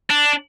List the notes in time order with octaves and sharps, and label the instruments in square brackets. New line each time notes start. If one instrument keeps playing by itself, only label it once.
[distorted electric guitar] D4